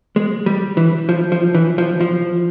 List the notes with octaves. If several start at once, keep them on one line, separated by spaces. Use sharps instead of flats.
G#3
G3
E3
F3
F3
E3
F3
F3